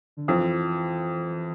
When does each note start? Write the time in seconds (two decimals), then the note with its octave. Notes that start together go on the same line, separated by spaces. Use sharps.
0.17 D3
0.28 F2 E3